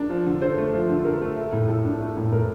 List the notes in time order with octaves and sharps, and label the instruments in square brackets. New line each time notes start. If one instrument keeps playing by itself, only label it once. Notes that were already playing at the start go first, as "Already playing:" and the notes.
Already playing: [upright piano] D4 A#4
F3
D3
D3 A4 C5
A3
F3
D3
D3 A#4
A3
A3
A2
A2 A4
D4
A3
A2
A2 A#4